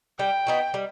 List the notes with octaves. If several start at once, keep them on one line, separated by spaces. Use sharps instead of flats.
G3 G5
B3 D#4 F#4
G3